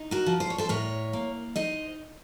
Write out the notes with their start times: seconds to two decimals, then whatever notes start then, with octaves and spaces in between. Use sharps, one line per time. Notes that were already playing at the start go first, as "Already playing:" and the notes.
Already playing: D#4
0.11 F#4 A#4
0.26 F3
0.40 C5
0.50 C#5
0.58 A4 C5
0.69 A2 A#4 C#5
1.13 A#3
1.56 D#4 C5 D#5